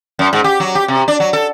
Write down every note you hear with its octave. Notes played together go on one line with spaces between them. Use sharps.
F#2
G#2
G4
F#3
G4
C3
D4
F#3
A4